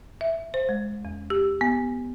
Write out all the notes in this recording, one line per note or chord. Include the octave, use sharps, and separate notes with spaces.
E5
C5
G#3
E2
G4
B3